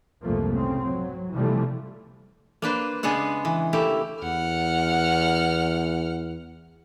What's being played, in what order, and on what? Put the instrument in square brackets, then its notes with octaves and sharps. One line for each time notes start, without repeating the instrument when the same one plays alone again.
[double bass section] C2 F2 G#2 F3 A3 A#3
C#3 C4
F#3
C3 E3 F3 G3 A3
[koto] A#3 D4 B4 C5
C#3 G#3 B3 D4 G#4 F#5
E3
A3 A#3 E4 G4
[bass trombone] E2 [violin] F#5 F6